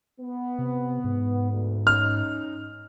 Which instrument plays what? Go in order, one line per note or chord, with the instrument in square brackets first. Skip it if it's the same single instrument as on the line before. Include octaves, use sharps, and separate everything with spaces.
[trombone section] B3
[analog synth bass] C3
G#2
[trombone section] D2
[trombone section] C#4 D#4 [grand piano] F6